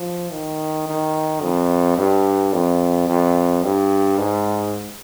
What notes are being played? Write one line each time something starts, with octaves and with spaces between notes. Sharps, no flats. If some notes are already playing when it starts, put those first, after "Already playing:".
Already playing: F3
D#3
D#3
F2
G2
F2
F2
G2
G#2